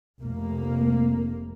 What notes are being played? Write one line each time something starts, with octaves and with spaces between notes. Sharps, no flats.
F1 A#3